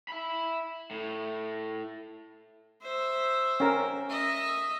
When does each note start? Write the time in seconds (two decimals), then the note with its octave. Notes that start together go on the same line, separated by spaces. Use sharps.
0.08 E5 B5
0.91 A2
2.82 C5 E5
3.60 C#4 A#4
4.10 D#5 E5